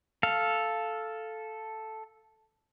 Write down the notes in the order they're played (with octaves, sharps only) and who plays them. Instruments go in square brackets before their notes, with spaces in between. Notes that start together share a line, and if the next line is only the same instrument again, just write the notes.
[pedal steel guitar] A4 F5